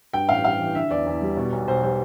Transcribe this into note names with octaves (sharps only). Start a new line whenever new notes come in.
G2 G5
A1 F5
G3 F5
E3
D3 E5
E2 D5
E2
G3
B2
B1
B1 C5
G3 C5